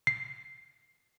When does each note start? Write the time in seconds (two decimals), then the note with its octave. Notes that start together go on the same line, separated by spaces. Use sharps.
0.07 C7